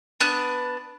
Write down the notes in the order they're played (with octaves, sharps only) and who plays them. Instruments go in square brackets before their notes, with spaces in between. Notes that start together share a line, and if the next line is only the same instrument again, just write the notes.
[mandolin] B3 D4 F#6